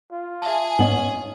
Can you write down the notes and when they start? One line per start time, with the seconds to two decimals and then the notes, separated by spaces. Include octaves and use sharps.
0.12 F4
0.42 G#4 E5 G#5 A5
0.79 G#2 B3 C#4 D#5 F#7